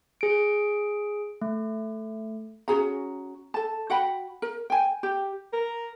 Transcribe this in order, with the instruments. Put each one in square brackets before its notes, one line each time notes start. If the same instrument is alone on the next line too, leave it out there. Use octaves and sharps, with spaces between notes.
[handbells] G#4 D7
A3
[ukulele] C#4 F#4 G#4 A#5
A4 A5
F#4 F#5 G5 B5
A#4
G5 G#5
G4
[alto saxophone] A#4